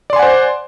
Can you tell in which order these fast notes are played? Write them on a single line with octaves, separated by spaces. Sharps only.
D5 C6 G#5 F#5 C5